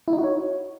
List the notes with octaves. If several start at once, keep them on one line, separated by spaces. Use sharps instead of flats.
E4
D#4
F#4
C#5